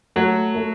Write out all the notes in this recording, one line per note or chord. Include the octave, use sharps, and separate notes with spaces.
F#3 A3
A3